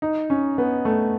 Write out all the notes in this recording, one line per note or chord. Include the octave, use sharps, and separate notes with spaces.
D#4
C#4
B3
A3